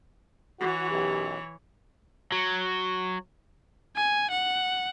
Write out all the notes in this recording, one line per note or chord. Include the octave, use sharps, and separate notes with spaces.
E3 F#4 C#5
B1 F#2 G4
F#3
G#5
F#5